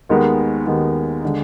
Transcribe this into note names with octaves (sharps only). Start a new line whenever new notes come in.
D#2 D#3 G#3 B3
D#2 D#3 G#3 B3
D3 G#3